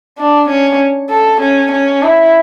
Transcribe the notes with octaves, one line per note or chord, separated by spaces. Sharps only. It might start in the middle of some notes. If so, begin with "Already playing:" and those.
D4
C#4
A4
C#4
C#4
E4